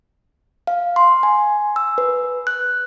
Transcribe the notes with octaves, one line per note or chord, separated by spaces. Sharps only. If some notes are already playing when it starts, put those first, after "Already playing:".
F5
C6
G#5
E6
B4
F#6